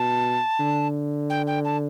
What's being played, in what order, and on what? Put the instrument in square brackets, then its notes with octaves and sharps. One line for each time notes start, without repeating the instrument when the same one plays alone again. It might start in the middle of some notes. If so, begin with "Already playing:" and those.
Already playing: [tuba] B2 [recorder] A5
[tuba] D3
[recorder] G5
G5
A5